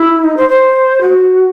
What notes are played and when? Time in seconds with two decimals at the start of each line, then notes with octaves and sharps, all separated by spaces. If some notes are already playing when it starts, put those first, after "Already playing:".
Already playing: E4
0.24 D#4
0.37 C5
0.49 C5
1.01 F#4